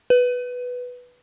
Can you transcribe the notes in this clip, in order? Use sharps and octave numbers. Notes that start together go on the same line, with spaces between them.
B4